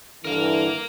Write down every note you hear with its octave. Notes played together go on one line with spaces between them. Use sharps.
G2 D3 E3 A#4 F5